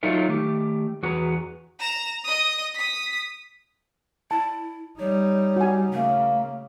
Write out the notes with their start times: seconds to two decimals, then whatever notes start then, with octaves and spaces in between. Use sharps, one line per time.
0.03 F#3 D#4 F4 A4 E5
0.29 D#3 A3 G4
1.03 E2 F#4 G#4 B4 A#5
1.79 A#5 E7
2.24 D#5 D#6
2.74 D#6 B6
4.31 E4 A5
4.99 G3 D#4 C#5
5.56 F#4 G#5
5.93 C#3 A3 A#3